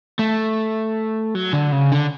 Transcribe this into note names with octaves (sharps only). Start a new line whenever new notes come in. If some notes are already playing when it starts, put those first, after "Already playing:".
A3
F#3
D3
C#3
D3